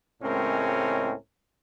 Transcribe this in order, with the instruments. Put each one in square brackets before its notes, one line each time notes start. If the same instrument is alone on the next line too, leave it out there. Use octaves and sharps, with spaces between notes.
[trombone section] C#2 A2 G#3 C4 C#4 A#4